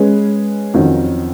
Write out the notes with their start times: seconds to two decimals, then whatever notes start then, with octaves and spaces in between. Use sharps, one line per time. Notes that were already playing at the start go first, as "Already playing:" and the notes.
Already playing: G#3 C#4 G#4 B4
0.74 F2 D#3 F#3 C#4 F#4